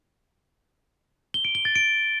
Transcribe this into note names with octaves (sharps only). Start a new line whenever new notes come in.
G7
D7
G7
A6
D7